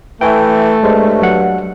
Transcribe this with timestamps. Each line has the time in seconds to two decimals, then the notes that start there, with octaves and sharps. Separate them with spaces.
0.21 E3 A3 G5 G#5
0.83 G2 G#3 C5
1.22 F#3 F#5